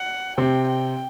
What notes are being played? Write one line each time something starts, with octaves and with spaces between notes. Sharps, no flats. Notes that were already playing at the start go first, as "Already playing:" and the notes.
Already playing: F#5
C3 C4 G5
G5